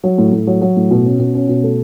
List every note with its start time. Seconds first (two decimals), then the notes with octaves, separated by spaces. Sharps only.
0.04 F#3
0.18 A2
0.33 A2
0.47 F#3
0.62 F#3
0.77 A2
0.91 B2
1.06 C#4
1.20 B2
1.35 C#4
1.49 B2
1.64 A3